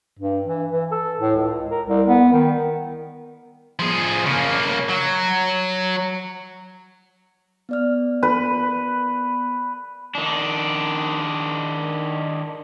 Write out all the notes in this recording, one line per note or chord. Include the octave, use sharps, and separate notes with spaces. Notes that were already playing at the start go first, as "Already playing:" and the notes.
G2
E3
E3
A4
A2
C#2
A#4
C2
B3
D#3
F3 G#4
C#3 A#3
F#3
B3 D5 F6
B4
D#3 D4